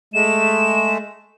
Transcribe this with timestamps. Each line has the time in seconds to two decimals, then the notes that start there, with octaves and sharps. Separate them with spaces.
0.14 G#3 A3 E7